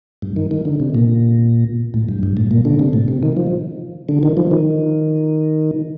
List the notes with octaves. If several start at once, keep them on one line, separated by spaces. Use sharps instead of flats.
G2
D#3
D#3
D3
C3
A#2
A2
G2
G2
A2
A#2
D3
C3
A2
C3
D#3
F3
D3
D#3
F3
D#3